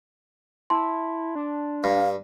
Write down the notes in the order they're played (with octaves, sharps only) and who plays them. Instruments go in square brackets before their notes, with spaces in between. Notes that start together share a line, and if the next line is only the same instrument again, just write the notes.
[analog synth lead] E4 [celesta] A5 C6
[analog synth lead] D4
[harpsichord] G2 [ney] F5